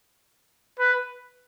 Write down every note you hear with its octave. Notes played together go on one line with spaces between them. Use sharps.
B4